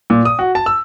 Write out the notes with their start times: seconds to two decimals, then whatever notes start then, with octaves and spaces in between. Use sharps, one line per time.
0.10 A#2
0.25 D#6
0.39 F#4
0.55 A5
0.66 E6